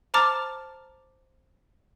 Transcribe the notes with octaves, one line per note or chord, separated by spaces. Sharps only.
C5 A5 A#5 D6 F6 A6